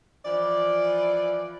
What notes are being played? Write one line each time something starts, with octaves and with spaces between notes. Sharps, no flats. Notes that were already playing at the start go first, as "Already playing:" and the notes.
E3 F3 D5